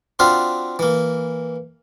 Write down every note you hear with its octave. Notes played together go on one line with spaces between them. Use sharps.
C4 D4 F4 F#4 E5 F5
E3 A#3